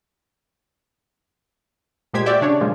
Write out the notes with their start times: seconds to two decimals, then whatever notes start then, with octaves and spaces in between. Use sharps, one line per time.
2.14 A#2 G#3 G4 C5 G#6 B6
2.26 F#4 G4 D5 E5 G5
2.41 C#3 D4 C#5
2.61 A#2 F3 G#3 F4